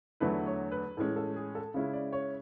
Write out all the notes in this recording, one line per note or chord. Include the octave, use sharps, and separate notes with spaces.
E2 D3 F#3 A3 E4 B4
C#5
B4
A2 E3 G#3 C#4 A4
A4
G#4
A4
C#3 G#3 C#4 E4
D5
C#5